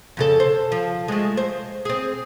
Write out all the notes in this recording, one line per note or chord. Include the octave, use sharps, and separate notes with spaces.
F2 C#3 A4
C5
F3
G#3 A3
C5
C4 G#4